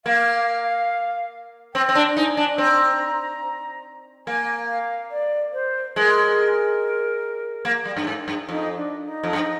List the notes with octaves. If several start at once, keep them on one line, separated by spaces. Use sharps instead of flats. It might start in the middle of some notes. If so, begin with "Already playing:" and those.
A#3 F5
C4 G5
C4
D4
D#4 G#5
D4
C4 A#5
A#3 G#5
F5
D5
C5
G#3 A#4 C5
A#3
G3
G2
G#2
G2
F2 D#4
D4
D#4
F2
G2